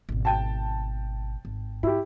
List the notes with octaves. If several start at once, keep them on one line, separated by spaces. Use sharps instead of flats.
G#1 B2
G5 A5
G#1
G#2 E4 G4